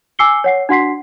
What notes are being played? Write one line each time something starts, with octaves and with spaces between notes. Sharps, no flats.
G#5 D6 E6 C7 C#7 G7
C#5 F#5 C7
D4 F#4 F#5 C6 B6 C7